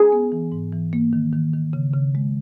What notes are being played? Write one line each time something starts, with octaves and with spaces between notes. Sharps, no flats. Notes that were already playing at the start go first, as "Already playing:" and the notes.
Already playing: G#4
B3
E3
G#2
E3
A#3
D#3
D#3
D#3
C#3
C#3
G#3